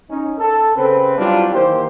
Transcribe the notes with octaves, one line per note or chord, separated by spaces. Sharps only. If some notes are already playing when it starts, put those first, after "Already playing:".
C#4 D#4
A4
C#3 C4 B4
F#3 G3 C4 D4 E4 F4
D#3 E3 A#3 G4 C5